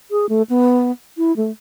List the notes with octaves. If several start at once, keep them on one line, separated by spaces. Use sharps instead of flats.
G#4
A3
B3
E4
A3